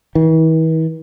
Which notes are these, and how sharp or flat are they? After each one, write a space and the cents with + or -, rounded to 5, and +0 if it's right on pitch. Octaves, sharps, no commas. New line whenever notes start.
E3 -40